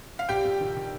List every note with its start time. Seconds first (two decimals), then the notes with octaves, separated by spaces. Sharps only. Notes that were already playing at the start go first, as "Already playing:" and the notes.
0.19 F5
0.29 A#1 G4 G5
0.45 A#1
0.61 D#3
0.77 D#3